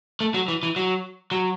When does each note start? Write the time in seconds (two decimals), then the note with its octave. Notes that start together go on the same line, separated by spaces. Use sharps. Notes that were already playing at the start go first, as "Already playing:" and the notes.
0.21 A3
0.34 F#3
0.48 E3
0.63 E3
0.76 F#3
1.31 F#3